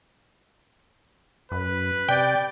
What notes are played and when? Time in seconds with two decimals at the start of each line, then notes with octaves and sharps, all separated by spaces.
1.51 F#2 B4
2.09 C3 D5 G5